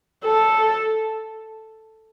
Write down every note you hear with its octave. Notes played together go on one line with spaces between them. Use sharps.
A4